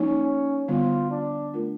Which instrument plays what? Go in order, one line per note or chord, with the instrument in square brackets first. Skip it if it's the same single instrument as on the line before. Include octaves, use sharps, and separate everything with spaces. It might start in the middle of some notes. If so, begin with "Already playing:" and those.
Already playing: [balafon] F3 A#3 D#4 [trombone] C#4
[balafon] D3 G3 B3 [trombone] F4
[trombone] D4
[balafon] A3 D4 F4 A#4